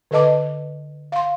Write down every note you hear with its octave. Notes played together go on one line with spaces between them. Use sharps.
D3 A4 B4 D#5 A5 D6
F5 C6